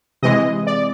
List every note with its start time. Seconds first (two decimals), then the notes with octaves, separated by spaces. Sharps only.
0.23 C3 E3 G#3 D#5
0.67 D5